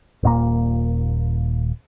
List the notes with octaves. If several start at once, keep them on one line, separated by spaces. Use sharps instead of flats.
D#1 A#2 A#3